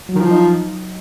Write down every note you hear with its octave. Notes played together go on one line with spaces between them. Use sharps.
F#3
D#3
F3
D#4